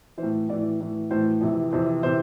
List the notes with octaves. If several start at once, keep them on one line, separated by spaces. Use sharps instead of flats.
E3 C5
A2
A2 E3 D5
A2 E3
A2 E3 C5
F2 C3 E3
F2 C3 E3 C5
C3 E3 C5